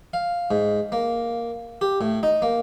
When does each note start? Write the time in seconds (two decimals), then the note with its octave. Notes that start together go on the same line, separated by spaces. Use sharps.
0.14 F5
0.51 G#2
0.92 A#3
1.81 G4
2.01 A2
2.23 D#4
2.42 A#3